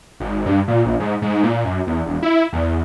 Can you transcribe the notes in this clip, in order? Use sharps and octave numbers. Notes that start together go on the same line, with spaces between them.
G#1
G2
A#2
A#1
G#2
G#2
A#2
F#2
E2
E1
E4
E2